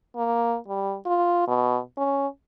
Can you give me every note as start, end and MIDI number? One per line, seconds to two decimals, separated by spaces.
0.16 0.57 58
0.68 0.96 55
1.06 1.47 65
1.48 1.79 47
1.97 2.27 61